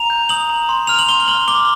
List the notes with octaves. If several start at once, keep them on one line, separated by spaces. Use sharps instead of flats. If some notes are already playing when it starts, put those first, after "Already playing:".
Already playing: A#5 F7
G6
D#6 F#7
A#5
C6
F6 F7
F#7
C6 G7
G7
F6 F#7
D6 G7